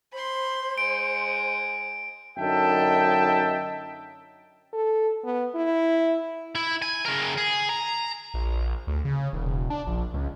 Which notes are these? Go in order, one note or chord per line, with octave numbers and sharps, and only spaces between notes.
C5 B5 C6
G#3 D7
F#2 D3 D#4 E5 G5 A5
A4
B3
E4
E4
G#5
C#3 A#4
G#4
A#5
A#1
D2
C#3
E1
D4
A#1
C#2